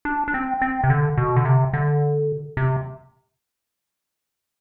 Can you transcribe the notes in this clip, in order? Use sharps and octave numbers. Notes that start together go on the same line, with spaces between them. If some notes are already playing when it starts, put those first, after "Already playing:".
D4
D4
C4
C4
C3
D3
B2
D3
C3
D3
C3